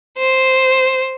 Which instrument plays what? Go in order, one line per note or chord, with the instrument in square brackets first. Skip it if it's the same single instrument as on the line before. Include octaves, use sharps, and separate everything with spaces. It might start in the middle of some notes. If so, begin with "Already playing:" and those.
[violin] C5